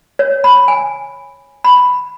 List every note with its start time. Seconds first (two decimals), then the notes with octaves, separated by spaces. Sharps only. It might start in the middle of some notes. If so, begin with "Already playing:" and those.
0.19 C#5
0.44 B5
0.68 G#5
1.64 B5